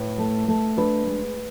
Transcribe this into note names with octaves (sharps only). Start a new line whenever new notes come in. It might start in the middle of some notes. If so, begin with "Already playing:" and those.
Already playing: A2 B4
A3
A3
D4 B4
G#3